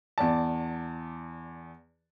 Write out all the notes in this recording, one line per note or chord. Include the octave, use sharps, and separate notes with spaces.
E2 D5 A5